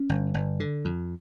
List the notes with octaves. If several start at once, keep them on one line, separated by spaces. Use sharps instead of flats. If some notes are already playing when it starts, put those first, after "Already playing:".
Already playing: C#4
G1
G1
D3
F2